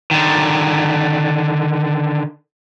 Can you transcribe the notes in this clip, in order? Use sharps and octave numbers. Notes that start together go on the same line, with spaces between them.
D3 D#3